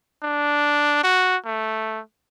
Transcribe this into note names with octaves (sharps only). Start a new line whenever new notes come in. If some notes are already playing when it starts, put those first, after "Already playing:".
D4
F#4
A3